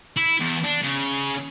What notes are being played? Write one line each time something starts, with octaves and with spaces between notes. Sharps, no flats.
E4
E2
D4
C#3